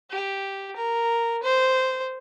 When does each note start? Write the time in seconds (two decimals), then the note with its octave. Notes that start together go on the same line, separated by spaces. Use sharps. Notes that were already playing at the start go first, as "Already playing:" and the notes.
0.10 G4
0.76 A#4
1.43 C5